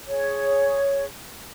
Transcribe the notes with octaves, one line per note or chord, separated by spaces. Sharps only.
G#4 C#5